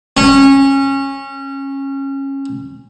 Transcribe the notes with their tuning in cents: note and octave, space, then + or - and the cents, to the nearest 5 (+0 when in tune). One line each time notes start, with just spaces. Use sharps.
C#4 -20